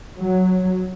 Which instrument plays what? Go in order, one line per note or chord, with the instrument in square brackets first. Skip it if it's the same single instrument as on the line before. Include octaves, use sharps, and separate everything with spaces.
[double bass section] F#3